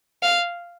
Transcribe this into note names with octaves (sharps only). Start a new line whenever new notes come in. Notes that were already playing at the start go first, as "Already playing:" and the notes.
F5